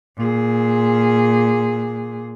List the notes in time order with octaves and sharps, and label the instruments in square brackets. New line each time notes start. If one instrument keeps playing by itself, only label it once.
[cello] A#2 G#4